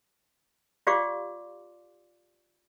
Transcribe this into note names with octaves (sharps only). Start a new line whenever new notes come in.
F4 G4 D5 F5 C6 D6